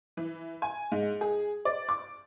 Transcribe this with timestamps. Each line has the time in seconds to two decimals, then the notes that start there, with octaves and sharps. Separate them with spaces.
0.17 E3
0.62 G#5
0.92 G#2
1.21 G#4
1.65 D5
1.89 D6